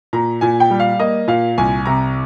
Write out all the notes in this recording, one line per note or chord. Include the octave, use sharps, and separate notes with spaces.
A#2 A#5
A#2 G#5
G5
G3
F5
A#3 D#5
A#2 F5
C2 G#5
C3 A#5